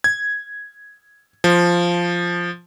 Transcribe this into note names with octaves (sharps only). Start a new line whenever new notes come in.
G#6
F3